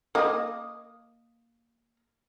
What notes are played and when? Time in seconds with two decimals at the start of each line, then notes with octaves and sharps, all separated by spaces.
0.15 A#3 D#5